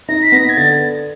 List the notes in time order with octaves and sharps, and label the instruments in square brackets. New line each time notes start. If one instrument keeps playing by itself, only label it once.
[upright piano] D#4 [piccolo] A#6
[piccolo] B6
[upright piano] B3 [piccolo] A#6
[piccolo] G#6
[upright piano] D3 [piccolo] A6